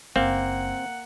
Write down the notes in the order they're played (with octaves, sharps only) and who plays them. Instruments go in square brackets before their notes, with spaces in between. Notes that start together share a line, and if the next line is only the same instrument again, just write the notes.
[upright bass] F#1 [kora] A#3 [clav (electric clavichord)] C4 [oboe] F#5